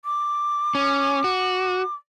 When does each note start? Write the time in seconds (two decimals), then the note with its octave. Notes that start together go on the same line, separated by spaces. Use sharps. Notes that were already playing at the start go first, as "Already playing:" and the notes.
0.05 D6
0.75 C#4
1.24 F#4